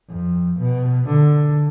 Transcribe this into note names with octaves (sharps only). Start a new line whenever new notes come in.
F2
B2
D3